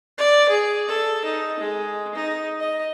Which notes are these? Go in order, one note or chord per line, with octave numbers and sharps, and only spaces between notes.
D5
G#4
A4
D#4
G#3
D#4
D#5